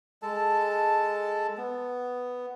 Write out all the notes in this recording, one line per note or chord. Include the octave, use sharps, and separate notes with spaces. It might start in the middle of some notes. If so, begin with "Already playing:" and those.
G#3 A4 A5
B3